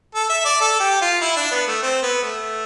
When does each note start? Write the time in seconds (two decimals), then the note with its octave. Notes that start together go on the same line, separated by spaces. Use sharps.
0.14 A4
0.29 E5
0.45 D5
0.61 A4
0.80 G4
1.01 F4
1.21 E4
1.36 D4
1.51 B3
1.67 A3
1.82 C4
2.02 B3
2.23 A3